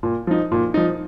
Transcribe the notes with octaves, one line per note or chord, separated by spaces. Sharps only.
A#2
F3 D#4
A#2
F3 D#4